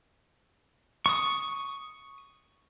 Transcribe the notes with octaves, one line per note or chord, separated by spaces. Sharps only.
C#6 D#6